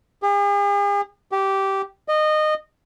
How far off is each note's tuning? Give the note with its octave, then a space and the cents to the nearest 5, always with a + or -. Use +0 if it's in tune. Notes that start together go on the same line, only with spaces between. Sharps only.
G#4 -45
G4 -10
D#5 -20